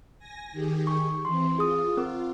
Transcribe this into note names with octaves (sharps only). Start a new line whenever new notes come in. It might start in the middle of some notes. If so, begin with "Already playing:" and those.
G#5 A#6
D#3 G4 G#4
C#6
E3 C4 C6
F4 G#4 D#6
C4 A#4 D6